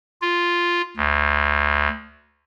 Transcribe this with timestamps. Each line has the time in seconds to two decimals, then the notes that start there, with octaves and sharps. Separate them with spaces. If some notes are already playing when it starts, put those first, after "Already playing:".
0.21 F4
0.97 D2